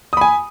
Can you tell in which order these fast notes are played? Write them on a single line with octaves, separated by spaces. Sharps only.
D#6 B5 G#5